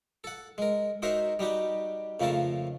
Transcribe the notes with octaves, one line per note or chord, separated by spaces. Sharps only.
A4 F#5
G#3 A#4
D#4 F#4 A#4 C5 C#5 E5
G3 D#4 F#4 G4
F2 C#3 F3 A3 A#4 A5